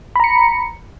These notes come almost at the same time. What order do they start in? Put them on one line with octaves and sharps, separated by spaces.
B5 A#5 C#7